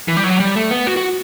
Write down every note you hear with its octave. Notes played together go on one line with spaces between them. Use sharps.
E3
G3
F#3
G3
A3
B3
F#4
F#4